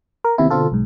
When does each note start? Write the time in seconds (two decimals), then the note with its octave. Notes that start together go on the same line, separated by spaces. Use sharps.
0.24 A#4
0.38 D#2 C3 B3 C4 E4
0.50 B2 D3 C4 F4 A4
0.72 B1 G#2